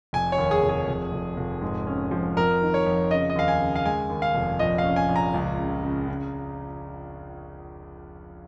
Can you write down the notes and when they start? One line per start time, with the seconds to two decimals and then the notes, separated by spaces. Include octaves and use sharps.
0.13 F1 G#5
0.32 C#5
0.38 D#2
0.51 G#4
0.63 F1
0.69 G#4
0.88 F1
1.12 F1
1.37 F1
1.61 G#2
1.87 C#4
2.11 F3
2.37 F2 A#4
2.62 D#3
2.74 C#5
2.86 F2
3.11 C#3 D#5
3.30 D#5
3.36 D#2 F5
3.48 G#5
3.60 C#3
3.76 F5
3.85 G#3 G#5
4.10 D#2
4.22 F5
4.34 F1
4.59 A#1 D#5
4.78 F5
4.84 C#4
4.96 G#5
5.09 A#1
5.16 A#5
5.34 C#2
5.58 C#3
5.83 C#3
6.08 C#3